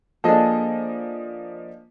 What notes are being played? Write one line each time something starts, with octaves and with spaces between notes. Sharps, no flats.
F3 A#3 D4 G#4 A4 D#5